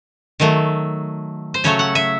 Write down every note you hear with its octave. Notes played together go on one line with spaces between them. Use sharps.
D#3 F#3 A3
C5
C#3 F#3 A3 C#5
F#5
E5